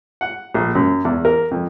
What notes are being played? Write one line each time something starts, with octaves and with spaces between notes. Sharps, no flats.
F#5
A#1
F#2
E2
A#4
F2